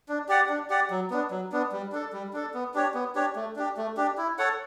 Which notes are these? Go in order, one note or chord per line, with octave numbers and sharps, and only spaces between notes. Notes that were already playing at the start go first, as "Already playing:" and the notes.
D4
G4 D5 F#5
D4
G4 D5 F#5
F#3
B3 D4
F#3
B3 D4
G3
D4 A4
G3
D4 A4
B3
D4 G4 C#5
B3
D4 G4 C#5
A3
D4 G4
A3
D4 G4
E4
A4 C#5 F#5